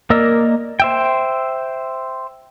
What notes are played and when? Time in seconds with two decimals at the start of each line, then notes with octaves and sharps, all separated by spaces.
0.10 A#3 A#4 D5 D#5 E6
0.80 C5 E5 G5